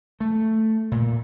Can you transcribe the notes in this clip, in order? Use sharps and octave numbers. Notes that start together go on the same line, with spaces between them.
A3
A#2